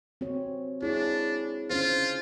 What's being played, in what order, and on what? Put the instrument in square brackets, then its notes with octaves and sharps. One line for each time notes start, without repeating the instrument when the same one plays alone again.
[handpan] C4 F#4 C#5
[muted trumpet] D4 [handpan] E4 G#4 C#5
[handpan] C#4 D4 C5 [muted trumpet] F4